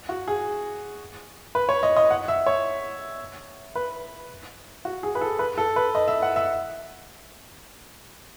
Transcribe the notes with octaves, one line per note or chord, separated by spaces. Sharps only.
F#4
G#4
B4
C#5
D#5
D#5
F#5
E5
C#5
B4
F#4
G#4
B4
A4
B4
A4
B4
D#5
E5
F#5
E5